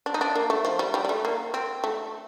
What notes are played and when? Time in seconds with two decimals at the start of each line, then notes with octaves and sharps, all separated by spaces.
0.06 D4
0.14 D#4
0.21 D4
0.36 A#3
0.50 A3
0.65 F3
0.79 G3
0.94 G3
1.05 G3
1.09 A3
1.25 A#3
1.54 C4
1.84 A3